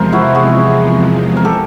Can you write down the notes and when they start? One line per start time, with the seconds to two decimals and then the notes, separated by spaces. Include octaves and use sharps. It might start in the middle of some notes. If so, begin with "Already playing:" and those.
Already playing: E2 C3 F3 G#3 A#4 C5
0.12 E4 F#4
0.35 F#4 G#4
1.37 A#4
1.45 G4 A4